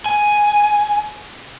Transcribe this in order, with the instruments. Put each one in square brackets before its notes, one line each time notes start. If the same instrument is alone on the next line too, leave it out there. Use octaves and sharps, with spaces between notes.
[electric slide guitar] G#5